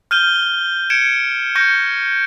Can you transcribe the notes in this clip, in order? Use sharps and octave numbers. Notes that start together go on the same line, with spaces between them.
F6 G6 D#7 G7
G#6 C#7 D7 E7
C#6 G6 A#6 C#7 D#7